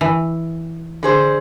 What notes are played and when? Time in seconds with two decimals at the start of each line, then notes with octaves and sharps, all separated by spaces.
0.01 E3
1.03 D3 G#4 C5